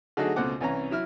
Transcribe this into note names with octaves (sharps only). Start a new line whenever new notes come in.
D3 F#3 A3 D#4 F#4 G#4
C#2 B2 A3 C5 F#5 D6
C2 E3 C#4 A#5
F#3 E4 F6